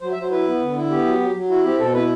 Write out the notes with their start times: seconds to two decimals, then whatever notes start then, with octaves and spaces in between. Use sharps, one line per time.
0.01 F#3 C5
0.12 E5
0.17 F#3 C5
0.31 E4 B4
0.47 B3
0.61 D3
0.76 E4
0.90 B3 G4
1.05 F#3
1.20 F#3
1.36 F#3
1.49 E4 F#4
1.64 C4 G4
1.79 B2 A4
1.94 E4 B4